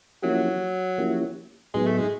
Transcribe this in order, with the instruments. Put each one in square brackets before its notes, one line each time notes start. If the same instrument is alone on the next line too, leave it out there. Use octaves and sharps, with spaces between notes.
[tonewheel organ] F3 A#3 C#4 E4 G4 [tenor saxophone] F#3
[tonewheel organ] F3 A#3 C#4 E4 G4
[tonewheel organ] A2 F#3 B3 D#4 [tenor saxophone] G#3
[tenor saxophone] A3
G#3